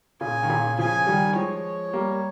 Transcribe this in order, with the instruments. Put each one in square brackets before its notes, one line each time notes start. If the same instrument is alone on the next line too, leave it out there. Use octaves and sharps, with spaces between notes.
[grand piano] A#2 C#3 [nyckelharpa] G#5
[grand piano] D#3
A#2 C#3
[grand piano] C#3 F3 [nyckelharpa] G#5
[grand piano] D#3 G3
[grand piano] F3 G#3 [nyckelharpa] C#5
[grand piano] G3 A#3